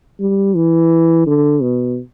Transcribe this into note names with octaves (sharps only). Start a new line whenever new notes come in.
G3
E3
D3
B2